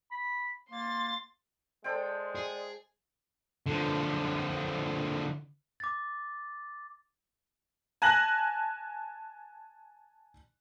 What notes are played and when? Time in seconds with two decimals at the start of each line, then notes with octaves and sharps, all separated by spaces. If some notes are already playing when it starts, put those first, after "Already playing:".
0.12 B5
0.71 A#3 C6 A6
1.84 G#3 A4 C5 D5 G5
2.35 G#4
3.66 D3 F3
5.80 D6 A6
8.02 G#5 A5 F#6 A#6 F#7